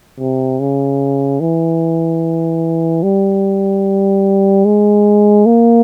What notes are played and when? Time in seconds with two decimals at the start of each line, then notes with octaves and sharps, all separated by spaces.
0.19 C3
0.60 C#3
1.41 E3
3.03 G3
4.65 G#3
5.46 A#3